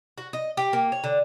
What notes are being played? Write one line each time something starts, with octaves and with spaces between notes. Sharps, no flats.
F#4
D#5
G4
A#3
C#5
D3